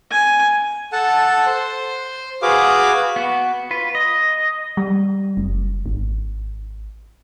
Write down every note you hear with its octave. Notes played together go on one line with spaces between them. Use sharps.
G#5
A4 F#5 A5
C5
F#4 G#4 B4 F5 D6
B3 F#4
F4 B4
D#5
G3
F#1
G#1